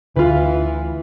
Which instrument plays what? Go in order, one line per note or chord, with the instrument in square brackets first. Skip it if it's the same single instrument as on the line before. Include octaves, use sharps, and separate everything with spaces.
[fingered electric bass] D2 D3 [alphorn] E3 [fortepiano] F4 B4